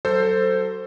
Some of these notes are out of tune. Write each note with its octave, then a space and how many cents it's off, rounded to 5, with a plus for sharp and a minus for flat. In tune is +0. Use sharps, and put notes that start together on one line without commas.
F#3 +25 A4 +15 C5 +0